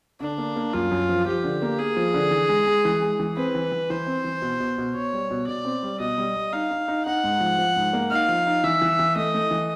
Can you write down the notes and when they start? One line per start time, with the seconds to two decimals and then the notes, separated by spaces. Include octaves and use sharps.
0.20 D3 D4
0.38 A#3
0.56 A#3
0.74 F#2 F4
0.91 F#2
1.09 F3
1.26 F3 G4
1.44 D3
1.62 A#3
1.79 A#3 G#4
1.97 F3
2.14 D3
2.31 E3
2.49 G#3
2.67 G#3
2.85 E3
3.01 G#3
3.19 E3
3.37 C4 B4
3.55 E3
3.72 E3
3.90 E3 C5
4.07 C4
4.24 E3
4.42 B2
4.60 B2
4.78 B2
4.95 B2 C#5
5.13 G3
5.31 B2
5.47 B2 D5
5.65 C4
5.83 G3
6.00 B2 D#5
6.18 G3
6.36 G3
6.53 D#4 F5
6.70 D#4
6.88 D#4
7.06 D#4 F#5
7.24 G#2
7.40 F3
7.58 F3
7.76 G#2
7.93 A#3
8.11 D#4 F5
8.28 F3
8.46 D#4
8.64 E3 E5
8.82 E3
8.99 E3
9.16 A3 D#5
9.34 A3
9.51 E3